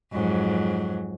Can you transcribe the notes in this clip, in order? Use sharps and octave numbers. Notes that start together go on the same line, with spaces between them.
F2 G#2 F#3